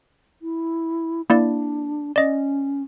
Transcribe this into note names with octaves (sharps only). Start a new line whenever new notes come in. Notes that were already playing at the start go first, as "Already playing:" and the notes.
E4
A#3 D4 E4 D5
C#4 D5 D#5